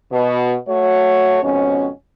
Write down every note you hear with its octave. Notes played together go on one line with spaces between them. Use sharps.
B2
A3 F#4 C#5
F2 G#2 B2 C#4